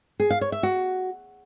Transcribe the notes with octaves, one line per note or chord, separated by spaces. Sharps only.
G#4
F5
C#5
E5
F#4